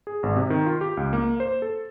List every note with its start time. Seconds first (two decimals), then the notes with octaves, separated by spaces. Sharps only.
0.07 G#4
0.23 G#1
0.36 C3
0.50 D#3
0.66 F4
0.81 G4
0.97 C#2
1.13 A#3
1.40 C5
1.62 A4